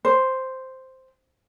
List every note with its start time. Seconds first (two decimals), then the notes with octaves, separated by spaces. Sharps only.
0.05 C5